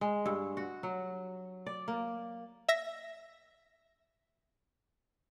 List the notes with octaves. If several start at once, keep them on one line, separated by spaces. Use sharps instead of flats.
G#3
G2
F#4
F#3
D5
A#3
E5 A#6